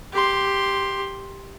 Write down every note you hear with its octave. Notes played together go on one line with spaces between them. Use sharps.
G4 C6